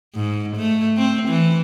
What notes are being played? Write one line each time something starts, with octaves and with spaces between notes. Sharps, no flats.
G#2
A3
C4
E3